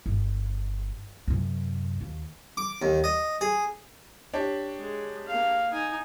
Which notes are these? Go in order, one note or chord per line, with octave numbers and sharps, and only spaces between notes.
G1
F#2 C3
D#2
D6
D#2
D#5
G#4
D4 G4 C#5
G#3
A#3 F5
D#4 G#5